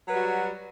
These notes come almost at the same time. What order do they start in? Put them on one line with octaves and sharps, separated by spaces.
F#3 B4 G3 F#4